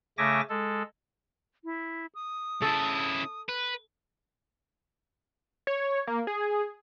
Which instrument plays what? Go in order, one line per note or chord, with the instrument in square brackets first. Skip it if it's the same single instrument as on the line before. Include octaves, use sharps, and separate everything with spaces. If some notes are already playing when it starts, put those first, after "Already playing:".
[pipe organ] C#3 A3 E5 G#5 D6 A#6
G#3 A4
[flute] E4
D#6
[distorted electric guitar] C#3 E4 [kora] A4
[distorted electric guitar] B4
[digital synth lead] C#5
A#3
G#4